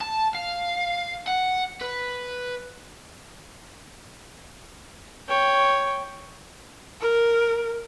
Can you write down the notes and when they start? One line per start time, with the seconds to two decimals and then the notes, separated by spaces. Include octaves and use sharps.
0.01 A5
0.35 F5
1.27 F#5
1.81 B4
5.29 C#5 G5
7.01 A#4